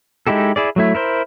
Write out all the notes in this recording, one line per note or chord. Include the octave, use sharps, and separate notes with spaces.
G#3 D#4 E4 G4 A4
E4 G#4 D5
F#3 A3 E4
E4 A#4 C5